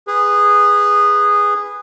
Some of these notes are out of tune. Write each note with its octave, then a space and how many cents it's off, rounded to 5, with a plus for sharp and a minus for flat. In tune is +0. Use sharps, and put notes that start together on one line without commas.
G#4 -15 B4 +0